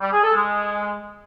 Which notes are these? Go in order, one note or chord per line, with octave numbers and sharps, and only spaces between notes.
G3
G#4
A4
G#3